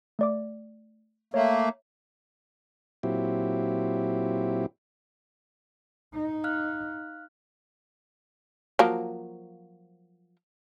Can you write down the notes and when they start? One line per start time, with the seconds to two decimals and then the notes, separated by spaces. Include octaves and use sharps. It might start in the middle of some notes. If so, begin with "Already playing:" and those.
0.19 A3 D5 D6
1.34 A3 A#3 C#5 E5
3.03 A#2 F#3 C4 E4 G4
6.14 D#4
6.44 F5 F6 F#6
8.79 F3 F#3 A#3